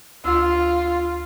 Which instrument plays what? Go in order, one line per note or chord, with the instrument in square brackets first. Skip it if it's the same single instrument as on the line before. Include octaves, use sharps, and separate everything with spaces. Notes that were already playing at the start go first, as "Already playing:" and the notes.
[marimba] D2 E6 [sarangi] F4